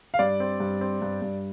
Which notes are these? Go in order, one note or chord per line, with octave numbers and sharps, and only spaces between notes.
F5
G2 D5
C4
G2
C4
G2
G2